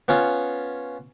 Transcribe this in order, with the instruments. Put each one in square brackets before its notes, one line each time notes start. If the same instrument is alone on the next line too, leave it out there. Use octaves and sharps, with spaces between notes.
[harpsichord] B3 C#4 F4